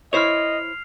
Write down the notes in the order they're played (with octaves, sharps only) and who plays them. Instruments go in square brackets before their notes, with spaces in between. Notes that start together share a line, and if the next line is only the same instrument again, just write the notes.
[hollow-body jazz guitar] E4 C5 C#5 [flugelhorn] D#5 [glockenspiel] F6 C7 F7